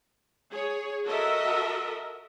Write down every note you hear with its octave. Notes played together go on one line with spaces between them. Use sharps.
G#4 C#5
F#4 A4 A#4 D#5 E5